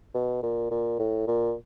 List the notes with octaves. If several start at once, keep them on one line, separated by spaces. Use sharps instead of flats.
B2
A#2
A#2
A2
A#2